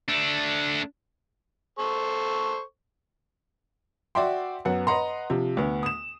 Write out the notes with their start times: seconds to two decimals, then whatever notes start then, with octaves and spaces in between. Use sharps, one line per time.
0.09 A3 D4
1.79 A4 C5 C#6
4.15 F#4 D5 E5 G5 C6
4.65 F#2 B3 F#5
4.87 B4 D#5 F#5 A#5 C6
5.30 C3 F3
5.57 D2 B3
5.83 D#6 E7